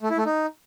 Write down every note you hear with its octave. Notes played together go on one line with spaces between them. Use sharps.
A3
E4
A3
D#4